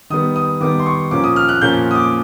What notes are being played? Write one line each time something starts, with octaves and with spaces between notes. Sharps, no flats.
D#3 G3 B3 D#6
D#6
D#3 G3 B3 D6
C6
C#6
A#2 F3 A#3 C#4 D6
D#6
F6
F#6
A#2 F3 A#3 C#4 G6
D#6
D6